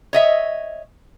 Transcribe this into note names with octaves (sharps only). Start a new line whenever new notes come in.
C#5 D#5 E5